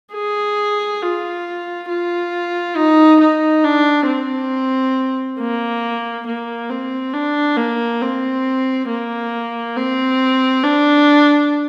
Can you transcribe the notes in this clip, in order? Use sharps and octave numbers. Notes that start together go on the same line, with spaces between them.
G#4
F4
F4
D#4
D#4
D4
C4
A#3
A#3
C4
D4
A#3
C4
A#3
C4
D4